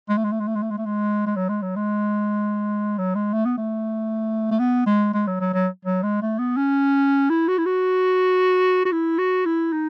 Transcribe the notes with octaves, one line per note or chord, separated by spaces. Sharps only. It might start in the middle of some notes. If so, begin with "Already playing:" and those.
G#3
A3
G#3
A3
G#3
A3
G#3
A3
G#3
A3
G#3
G#3
F#3
G#3
F#3
G#3
F#3
G#3
A3
B3
A3
A3
B3
G#3
G#3
F#3
F#3
F#3
F#3
G#3
A3
B3
C#4
E4
F#4
E4
F#4
F#4
E4
F#4
E4
D#4